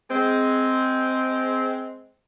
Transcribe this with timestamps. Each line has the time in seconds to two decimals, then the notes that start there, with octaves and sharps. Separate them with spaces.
0.10 G#3 C4